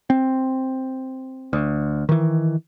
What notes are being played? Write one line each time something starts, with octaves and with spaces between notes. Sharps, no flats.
C4
D2
D#3 E3